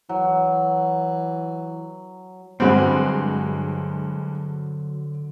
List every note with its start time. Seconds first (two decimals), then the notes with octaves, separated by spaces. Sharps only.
0.09 E3 F#3
2.60 G2 D3 F#3 G#3 C4 F#4 B5